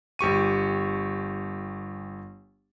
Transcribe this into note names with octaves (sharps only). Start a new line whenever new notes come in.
G1 G4 C#6 D#7